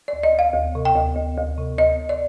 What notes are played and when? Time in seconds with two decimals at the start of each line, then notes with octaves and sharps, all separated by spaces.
0.08 D5
0.13 D2
0.23 D#5
0.34 D2 F5
0.54 D2
0.75 C3
0.85 G5
0.96 D2
1.16 D2
1.37 D2
1.57 C3
1.78 D2 D#5
1.99 D2
2.09 D5